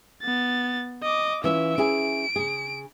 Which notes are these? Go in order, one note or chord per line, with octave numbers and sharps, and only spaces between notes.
B3 A6
D#5 D6
E3 C#4 F4 E5
C#4 E4 G#4 D7
C#3 G#4